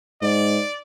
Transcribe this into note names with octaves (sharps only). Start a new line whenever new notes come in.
G#2 D5